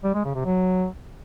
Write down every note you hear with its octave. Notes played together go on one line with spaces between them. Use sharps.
G3
G#3
C#3
C3
F#3